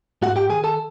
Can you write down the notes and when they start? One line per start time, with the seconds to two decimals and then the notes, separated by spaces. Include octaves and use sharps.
0.22 G#2 F#4 F#5
0.36 G4 G5
0.50 D#3 G#4 G#5
0.64 A4 A5